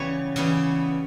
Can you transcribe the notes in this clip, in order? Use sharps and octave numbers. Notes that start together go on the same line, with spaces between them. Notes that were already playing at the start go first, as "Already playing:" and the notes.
Already playing: C#3 E3 G3 B3 B4 C#5
C#3 E3 G3 B3